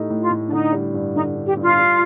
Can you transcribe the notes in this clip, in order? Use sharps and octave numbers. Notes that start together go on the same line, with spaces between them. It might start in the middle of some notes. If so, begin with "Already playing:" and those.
Already playing: A2 A3 D#4 G4
A2
F4
A2
D4
D3 D#4
G3
G2
D3 D#4
G2
G4
G2
F4
G3